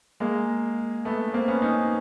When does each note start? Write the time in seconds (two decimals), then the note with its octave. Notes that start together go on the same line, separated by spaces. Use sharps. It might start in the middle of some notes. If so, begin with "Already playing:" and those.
0.20 G#3 A#3
1.05 A3 B3
1.33 A#3 C4
1.48 B3 C#4
1.62 C#4 D#4